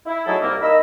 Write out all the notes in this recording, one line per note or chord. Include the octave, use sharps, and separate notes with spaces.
E4
F#3 A3 D#4 E4 G#4 A4
C2 A#3
A#3 D#4 D#5 A#5 B5 E6